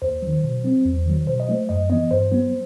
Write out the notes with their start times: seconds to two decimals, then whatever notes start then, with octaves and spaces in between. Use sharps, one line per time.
0.02 D#2 C5
0.22 D#3 F#3
0.44 B2
0.64 F#3 C4
0.85 E2
1.06 D#3 F#3
1.27 B2 C5
1.40 D#5
1.49 F#3 A3 C5
1.69 F#2 D#5
1.90 E3 B3 D#5
2.11 G2 C5
2.32 F#3 B3